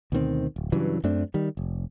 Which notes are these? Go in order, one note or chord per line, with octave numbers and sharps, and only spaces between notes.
D2 B2 D#3 C4
D1
G2 C#3 E3 F#3
F#2 A3 C4 D4
D#3 G3
F1